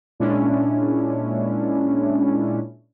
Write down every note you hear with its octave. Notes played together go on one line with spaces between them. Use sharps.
A#2 G#3 C#4 D4 E4